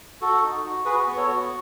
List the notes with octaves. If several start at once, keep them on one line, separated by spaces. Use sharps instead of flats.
F#4 A4
D#4
F#4
F#4 G#4 B4
B3
A4 C#5
F#4